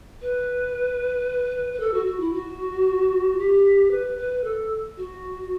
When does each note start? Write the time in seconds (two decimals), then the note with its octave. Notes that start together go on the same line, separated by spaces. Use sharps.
0.21 B4
1.73 B4
1.80 A4
1.93 F#4
2.06 F#4
2.20 E4
2.33 F#4
3.38 G4
3.91 B4
4.18 B4
4.44 A4
4.97 F#4